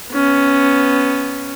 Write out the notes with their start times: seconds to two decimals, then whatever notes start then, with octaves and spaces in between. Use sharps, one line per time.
0.12 B3 C#4